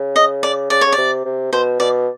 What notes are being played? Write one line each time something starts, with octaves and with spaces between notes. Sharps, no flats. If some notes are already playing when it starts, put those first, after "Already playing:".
Already playing: C#3
D#5
D5
C#3 D5
C#3 C#5
D5
C3
C3
B2 C5
B2 D5